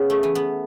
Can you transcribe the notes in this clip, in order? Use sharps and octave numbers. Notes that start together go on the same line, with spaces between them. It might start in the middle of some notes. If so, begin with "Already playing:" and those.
Already playing: C#3 B3
A3
E3
B3